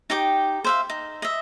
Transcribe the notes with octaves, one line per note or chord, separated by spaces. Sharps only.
D#4 G4 G5 D6
C5 E5 F5
D#4
D#5 E5